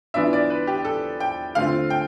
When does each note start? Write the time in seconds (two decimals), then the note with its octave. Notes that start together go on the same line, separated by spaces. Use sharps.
0.14 E3 B3 D4 F4 E5
0.33 D5
0.50 B4
0.67 G4
0.85 A4
1.20 G5
1.55 D3 A3 C4 F4 F5
1.90 G5